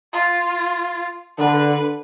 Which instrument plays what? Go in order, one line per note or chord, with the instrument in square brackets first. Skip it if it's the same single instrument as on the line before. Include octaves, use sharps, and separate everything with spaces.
[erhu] F4
[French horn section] D3 [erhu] B4